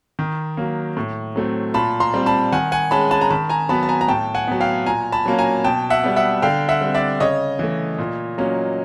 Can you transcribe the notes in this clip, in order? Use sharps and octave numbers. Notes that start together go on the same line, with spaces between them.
D#3
F#3 A#3
A2
F#3 A3 C4
A#2 A5 B5
A#5 C6
G3 C4
A5 B5
D#3 F#5 G#5
F#5 G#5
G#3 C#4 A5 B5
A5 B5
A#5
D#3 A5 B5
G#5 A#5
F#3 B3 A5 B5
A5
G#5 A#5
A#5
A2 G5 A5
F#5 G#5
F#3 B3
F5 G5
A#2 G#5 A#5
A5 B5
F#3 A#3 C#4
G#5 A#5
B2 G5 A5
E5 F#5
G3 B3
E5 F#5
D3 F5 G5
E5 F#5
G3 C4
D5 E5
C#3 C#5 D#5
E3 A3
A#2
F#3 A#3 C#4